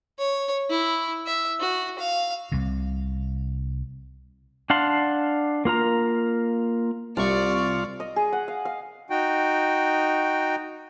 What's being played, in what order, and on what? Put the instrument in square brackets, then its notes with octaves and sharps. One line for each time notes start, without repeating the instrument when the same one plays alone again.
[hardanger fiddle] C#5
E4
E5
F#4
F5
[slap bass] C2 C3
[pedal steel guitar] D4 F5 F#5 A5 C6
A#3 F4 A#4 A#5
[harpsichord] C2 [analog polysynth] C3 C#6 [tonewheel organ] F4 [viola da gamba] D5
[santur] D#5
G#4
F#5
F5
F5
[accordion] D#4 F#4 G5